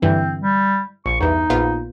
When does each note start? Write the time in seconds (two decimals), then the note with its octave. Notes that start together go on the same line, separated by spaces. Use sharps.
0.02 G2 D3 E3 C4
0.41 G3
1.06 A#1 C#6
1.21 E2 G2 E3 D#4
1.50 A#1 B3 F4